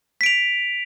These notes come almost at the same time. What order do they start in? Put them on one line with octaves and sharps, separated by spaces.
B6 D7 F7